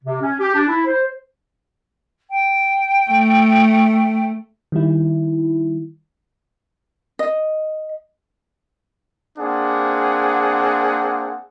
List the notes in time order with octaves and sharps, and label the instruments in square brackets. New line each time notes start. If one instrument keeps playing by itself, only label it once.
[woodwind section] C3
C#4
G4
D4
E4
C5
[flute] G5
[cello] A3
[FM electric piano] D#3 G3 E4
[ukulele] D#5
[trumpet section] A#3 C4 D4 G#4 F#5